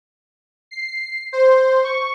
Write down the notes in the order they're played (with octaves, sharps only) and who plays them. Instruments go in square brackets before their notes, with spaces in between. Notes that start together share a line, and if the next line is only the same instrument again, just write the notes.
[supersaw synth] C7
C5
C#6